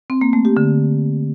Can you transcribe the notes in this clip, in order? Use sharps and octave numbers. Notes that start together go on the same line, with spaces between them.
C4
A#3
A3
G4
D3